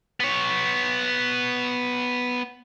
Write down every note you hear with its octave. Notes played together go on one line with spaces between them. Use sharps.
B3 C#5